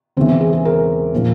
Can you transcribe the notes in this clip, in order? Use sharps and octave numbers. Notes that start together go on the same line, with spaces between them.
E1 E2 C#3 E3 C4
C4
G#4
G#4
A#4
A#2 F3